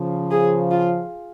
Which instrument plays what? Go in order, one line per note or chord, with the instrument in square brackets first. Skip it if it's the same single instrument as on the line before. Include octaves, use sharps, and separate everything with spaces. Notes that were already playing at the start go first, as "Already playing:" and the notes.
Already playing: [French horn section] C#3 F3
[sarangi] G#4
F4